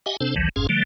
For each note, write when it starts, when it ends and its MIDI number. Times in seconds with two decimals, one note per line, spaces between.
0.06 0.17 67
0.06 0.17 75
0.06 0.17 76
0.06 0.17 78
0.06 0.17 80
0.20 0.35 48
0.20 0.35 60
0.20 0.35 62
0.20 0.35 69
0.20 0.35 72
0.36 0.49 33
0.36 0.49 38
0.36 0.49 51
0.36 0.49 52
0.36 0.49 54
0.56 0.67 31
0.56 0.67 41
0.56 0.67 44
0.56 0.67 61
0.56 0.67 68
0.56 0.67 77
0.69 0.83 50
0.69 0.83 53
0.69 0.83 55
0.69 0.83 57